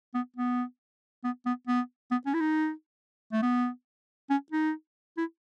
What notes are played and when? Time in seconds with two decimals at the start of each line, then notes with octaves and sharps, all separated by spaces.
0.14 B3
0.36 B3
1.24 B3
1.46 B3
1.67 B3
2.11 B3
2.26 C#4
2.34 E4
2.40 D#4
3.32 A3
3.42 B3
4.30 C#4
4.52 D#4
5.18 E4